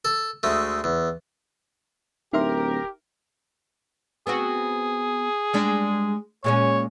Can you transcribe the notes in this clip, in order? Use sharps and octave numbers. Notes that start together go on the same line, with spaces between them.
A4
D2 G#3 A3
E2
D1 D#4 G4 A#4 E5 C6
B3 C4 F#4 G#4
G3 G#3 D4
A#2 G#3 C#4 C#5